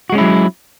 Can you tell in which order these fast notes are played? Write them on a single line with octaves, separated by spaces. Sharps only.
F#4 G#3 C#4 E4 F#3